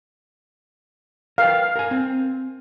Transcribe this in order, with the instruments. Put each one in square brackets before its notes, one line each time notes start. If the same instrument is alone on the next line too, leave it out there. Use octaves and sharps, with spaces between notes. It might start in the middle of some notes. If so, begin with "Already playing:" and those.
[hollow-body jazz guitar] A#4 B4 G5 [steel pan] F5
[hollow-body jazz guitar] A#4 G#5
C4